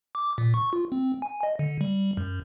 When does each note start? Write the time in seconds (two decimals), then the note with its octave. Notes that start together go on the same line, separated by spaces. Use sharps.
0.15 D6
0.38 A#2
0.54 C#6
0.73 F4
0.92 C4
1.22 G#5
1.43 D#5
1.59 D3
1.81 G3
2.17 F#2